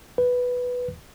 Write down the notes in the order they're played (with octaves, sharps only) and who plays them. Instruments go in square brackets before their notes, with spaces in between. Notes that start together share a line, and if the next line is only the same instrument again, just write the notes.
[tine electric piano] B4